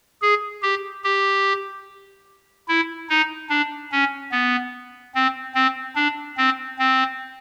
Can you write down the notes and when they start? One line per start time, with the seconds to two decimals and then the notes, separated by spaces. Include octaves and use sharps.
0.22 G#4
0.62 G4
1.04 G4
2.68 E4
3.09 D#4
3.49 D4
3.92 C#4
4.32 B3
5.15 C4
5.54 C4
5.95 D4
6.37 C4
6.79 C4